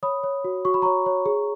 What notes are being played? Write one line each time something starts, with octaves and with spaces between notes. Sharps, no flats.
C#5 B5 D#6
C#5
F#4
F#4 C#6
B5
C#5 A#5 C#6
C#5
G#4